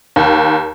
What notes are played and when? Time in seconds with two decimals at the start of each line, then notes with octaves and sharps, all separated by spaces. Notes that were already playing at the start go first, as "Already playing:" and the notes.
0.16 D#2